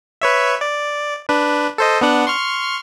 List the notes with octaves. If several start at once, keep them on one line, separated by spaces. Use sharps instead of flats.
B4 C#5 E5
D5
D4 B4
A4 C5 D#5
B3 D4 F#5
C6 C#6 F6